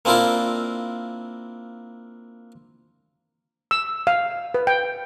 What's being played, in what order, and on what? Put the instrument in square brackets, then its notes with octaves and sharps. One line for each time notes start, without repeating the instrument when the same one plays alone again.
[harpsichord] A#3 C4 D4 E4 F4 A#4
[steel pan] E6
F5
B4
G5